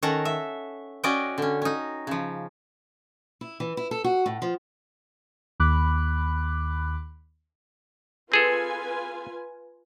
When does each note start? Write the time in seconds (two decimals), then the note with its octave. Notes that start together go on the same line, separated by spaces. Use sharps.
0.03 D#3 C#4 A4 F#5 A#5
0.25 E5
1.04 C#4 F#4 D5 D#5 G5
1.38 D3 C#4
1.62 C#4 D#4
2.07 C#3 F3
3.41 E4
3.60 E3
3.77 E4
3.91 A4
4.04 F#4
4.26 A2
4.42 F3
5.60 D#2 B5 D6 F#6
8.32 C4 F4 G#4 A4 B4 G#5